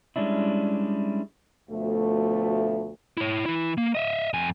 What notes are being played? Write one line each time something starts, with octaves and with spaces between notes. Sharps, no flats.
G3 G#3 C#4 D4 E4
D2 B2 F3 A3
E4 C#5
E3 E4
A#3
D#5 E5
F2 G#5